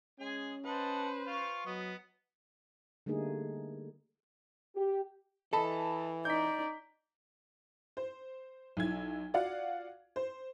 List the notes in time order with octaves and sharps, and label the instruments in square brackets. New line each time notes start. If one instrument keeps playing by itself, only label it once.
[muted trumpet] G#3 [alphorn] C#4 [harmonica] G#4 G#5
[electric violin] B4 C5 [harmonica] D#5 F#5 [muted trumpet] A5
[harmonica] F4 F5 [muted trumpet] C#6
[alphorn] F#3 [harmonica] B3 D#5
[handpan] D3 G3 A3 A#3 D#4 G#4
[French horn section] G4
[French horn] E3 [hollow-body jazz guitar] A4 [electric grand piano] D#5 A5 B5
[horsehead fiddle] D#4 D5 [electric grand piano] G6 B6
[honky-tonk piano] C5
B1 E4 G#6
F4 F#4 D5 F5 F#5
C5